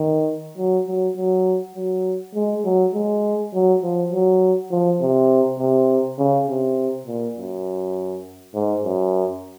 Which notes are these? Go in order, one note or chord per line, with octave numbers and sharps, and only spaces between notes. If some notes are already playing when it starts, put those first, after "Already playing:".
Already playing: D#3
F#3
F#3
F#3
F#3
G#3
F#3
G#3
F#3
F3
F#3
F3
C3
C3
C#3
C3
A#2
F#2
G#2
F#2